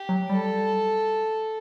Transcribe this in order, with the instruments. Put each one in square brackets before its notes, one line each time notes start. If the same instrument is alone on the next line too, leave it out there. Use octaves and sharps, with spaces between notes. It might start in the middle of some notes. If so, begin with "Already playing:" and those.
Already playing: [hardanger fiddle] G4
[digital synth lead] F#3
[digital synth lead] G3 [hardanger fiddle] A4